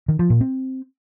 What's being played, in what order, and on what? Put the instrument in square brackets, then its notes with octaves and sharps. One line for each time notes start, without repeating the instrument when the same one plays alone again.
[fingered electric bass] D#3
F3
A#2
C4